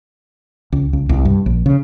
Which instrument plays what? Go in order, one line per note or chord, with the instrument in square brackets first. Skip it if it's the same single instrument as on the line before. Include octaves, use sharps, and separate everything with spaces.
[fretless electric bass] C#2
C#2
C2
G2
A#1
C#3